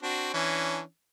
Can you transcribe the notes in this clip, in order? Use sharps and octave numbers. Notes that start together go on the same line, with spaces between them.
C4 D4 F#4
E3 C#4 D4